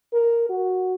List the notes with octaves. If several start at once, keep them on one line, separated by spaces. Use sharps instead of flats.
A#4
F#4